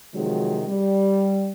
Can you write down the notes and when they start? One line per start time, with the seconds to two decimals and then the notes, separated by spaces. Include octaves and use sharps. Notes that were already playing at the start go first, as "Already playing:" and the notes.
0.15 C3 D#3 F3 F#3 G#3
0.68 G3